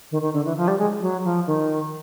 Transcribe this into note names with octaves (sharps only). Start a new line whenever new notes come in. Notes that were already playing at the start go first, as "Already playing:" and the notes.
D#3
D#3
D3
E3
F3
G3
G#3
F#3
F3
D#3